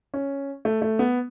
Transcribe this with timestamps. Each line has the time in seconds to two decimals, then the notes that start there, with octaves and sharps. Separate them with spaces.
0.14 C#4
0.65 A3
0.82 A3
0.99 B3